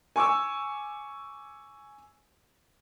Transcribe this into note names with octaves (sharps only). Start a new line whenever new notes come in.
G#5 C#6 D6 E6